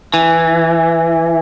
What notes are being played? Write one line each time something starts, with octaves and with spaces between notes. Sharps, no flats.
E3